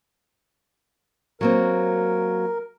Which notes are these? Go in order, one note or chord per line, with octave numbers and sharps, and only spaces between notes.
F#3 A#3 C4 A#4